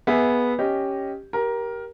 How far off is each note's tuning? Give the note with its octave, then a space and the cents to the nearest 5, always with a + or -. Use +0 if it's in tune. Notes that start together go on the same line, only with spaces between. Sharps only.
B3 -10 G#4 +0 E5 -10
C#4 +0 G4 +0 D#5 +0
G4 -15 A#4 +15